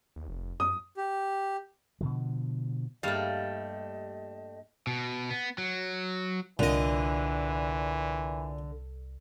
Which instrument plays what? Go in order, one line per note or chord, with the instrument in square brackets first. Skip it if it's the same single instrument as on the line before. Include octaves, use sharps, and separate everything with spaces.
[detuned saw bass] D#2
F1
[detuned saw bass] F#2 [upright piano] D#6
[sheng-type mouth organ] G4
[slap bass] B2 D3 F3
[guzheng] G2 A#3 F5 [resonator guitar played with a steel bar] G3 A3 [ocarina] D#5
[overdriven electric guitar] B2
B3
F#3
[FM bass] C2 [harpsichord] A#2 D#5 [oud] D3 [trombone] E3